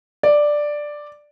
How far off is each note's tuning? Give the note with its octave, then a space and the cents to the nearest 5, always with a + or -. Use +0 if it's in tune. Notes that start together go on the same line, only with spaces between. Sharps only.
D5 +5